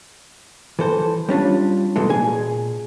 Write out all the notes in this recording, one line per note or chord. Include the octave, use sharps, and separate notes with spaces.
E3 A4 C5
G3 C#4 D4 F4
B2 E3 G#3 A4
A#2 G#4 G#5